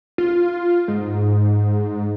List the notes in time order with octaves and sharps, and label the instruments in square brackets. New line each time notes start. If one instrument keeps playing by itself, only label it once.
[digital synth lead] F4
G#2